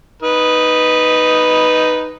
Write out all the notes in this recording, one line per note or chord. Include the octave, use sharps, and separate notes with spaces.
D#4 B4